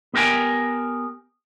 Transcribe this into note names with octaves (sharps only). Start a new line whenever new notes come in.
B3 G4 A#4 G5 G#5